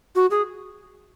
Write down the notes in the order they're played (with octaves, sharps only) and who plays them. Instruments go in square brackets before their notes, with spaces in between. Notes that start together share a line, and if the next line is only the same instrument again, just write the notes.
[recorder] F#4
G#4